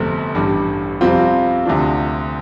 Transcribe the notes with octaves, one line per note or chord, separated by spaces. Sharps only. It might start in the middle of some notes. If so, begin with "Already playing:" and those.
Already playing: G1 F2 C3 A3 C4
A1 G2 G3
F2 C3 G3 C4 F4
D2 C3 F3 D4